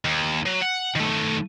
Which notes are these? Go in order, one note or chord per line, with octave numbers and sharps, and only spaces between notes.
D#2
F#3
F#5
D#3 A3